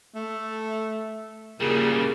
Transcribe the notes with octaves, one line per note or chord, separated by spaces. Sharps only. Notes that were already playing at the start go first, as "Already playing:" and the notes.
A3
A#2 C#3 G3 G#4